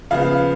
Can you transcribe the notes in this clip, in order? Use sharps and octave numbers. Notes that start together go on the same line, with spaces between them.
C#3 F3 B3 F5